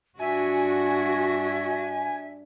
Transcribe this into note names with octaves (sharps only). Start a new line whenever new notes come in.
G2 D4 F#4 E5 G#5